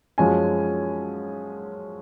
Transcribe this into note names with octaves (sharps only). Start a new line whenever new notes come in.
F#2 F3 G#3 C#4 G#5